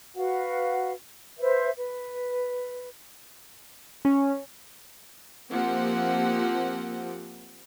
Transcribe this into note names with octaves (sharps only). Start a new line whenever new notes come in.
F#4 B4 F5 F#5
B4 C5 E5
B4
C#4
F3 A#3 C4 G4 F#5